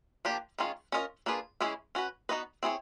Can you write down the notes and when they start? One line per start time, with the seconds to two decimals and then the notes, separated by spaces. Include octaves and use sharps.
0.25 F3 A#3 D4 G4
0.58 D#3 G#3 C#4 F4 G#4
0.92 C#4 F4 A#4 D#5
1.26 A#3 D4 F4 G#4 B4
1.60 E3 G#3 C#4 E4 G#4
1.95 C#4 F#4 B4
2.29 B3 D#4 F#4 B4 D#5
2.63 C4 E4 G#4 C#5